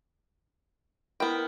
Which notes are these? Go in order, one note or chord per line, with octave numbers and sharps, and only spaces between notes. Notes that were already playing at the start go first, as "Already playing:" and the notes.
B3 E4 A#4 G5 B5